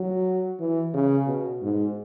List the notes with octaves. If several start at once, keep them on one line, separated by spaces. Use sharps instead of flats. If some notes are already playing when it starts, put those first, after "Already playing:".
Already playing: F#3
E3
C#3
B2
G#2